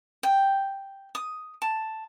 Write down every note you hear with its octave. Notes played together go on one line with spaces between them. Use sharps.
G5
D#6
A5